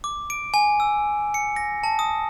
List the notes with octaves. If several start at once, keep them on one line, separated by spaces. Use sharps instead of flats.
D6
D7
G#5
E6
C#7
A#6
A5
D#6